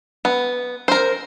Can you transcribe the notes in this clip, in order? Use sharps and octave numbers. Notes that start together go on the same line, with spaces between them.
B3
A#4 C5